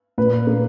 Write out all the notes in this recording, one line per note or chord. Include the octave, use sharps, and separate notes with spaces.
A#2 B4
A#3